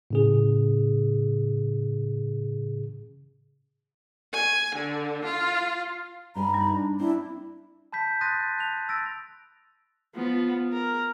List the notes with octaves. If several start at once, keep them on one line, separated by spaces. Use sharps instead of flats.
A2 C#3 G#4
G#5
D3
F4
G2 G4 G#5 A#5 B5
G3 D#4
D4
C4 D4 E4
A5 B5 G6 B6
C6 D#6 F#6 A6 A#6 D#7
A5 F#6 F7
E6 A6 A#6 D7
F3 B3
A#4